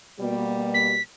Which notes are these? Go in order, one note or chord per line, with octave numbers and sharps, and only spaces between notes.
B2 G3 A#3
B6